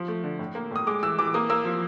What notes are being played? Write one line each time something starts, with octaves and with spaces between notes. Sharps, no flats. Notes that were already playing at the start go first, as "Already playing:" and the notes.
Already playing: F3
A3
D3
A2
A#3
A2 D#6
G#3 D6
E3 E6
E3 D6
A#3 D#6
A#3 E6
F3